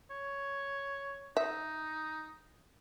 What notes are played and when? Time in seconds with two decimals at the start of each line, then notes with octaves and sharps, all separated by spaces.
0.10 C#5
1.37 D#4 E5